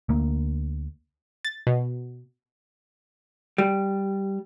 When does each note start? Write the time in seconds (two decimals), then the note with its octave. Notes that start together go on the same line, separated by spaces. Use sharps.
0.09 D2 A#3
1.45 A6
1.67 B2
3.58 G3